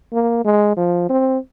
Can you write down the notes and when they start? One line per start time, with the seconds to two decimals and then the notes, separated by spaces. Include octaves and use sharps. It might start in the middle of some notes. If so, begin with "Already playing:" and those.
0.12 A#3
0.44 G#3
0.76 F3
1.09 C4